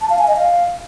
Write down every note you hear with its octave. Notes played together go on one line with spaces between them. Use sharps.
A5
F5
G#5
D#5
F5